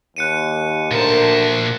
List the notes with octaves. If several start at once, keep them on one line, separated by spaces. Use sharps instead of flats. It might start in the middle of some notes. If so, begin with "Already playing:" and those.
D#2 F#6 C#7 D#7
D2 A#2 A#4 C5 A5